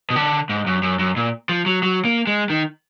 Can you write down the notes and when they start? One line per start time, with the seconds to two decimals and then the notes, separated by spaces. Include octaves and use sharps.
0.10 B2
0.16 D3
0.49 G#2
0.67 F#2
0.83 F#2
0.99 F#2
1.16 A#2
1.49 F3
1.66 F#3
1.83 F#3
2.05 A#3
2.27 G#3
2.50 D#3